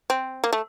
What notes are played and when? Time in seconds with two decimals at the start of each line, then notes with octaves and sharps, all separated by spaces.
0.10 C4
0.44 A#3
0.53 A3